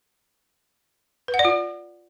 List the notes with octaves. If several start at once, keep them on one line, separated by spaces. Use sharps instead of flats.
B4
F#5
D5
F4